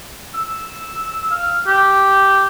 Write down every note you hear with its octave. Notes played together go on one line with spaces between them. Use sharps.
E6
F5
G4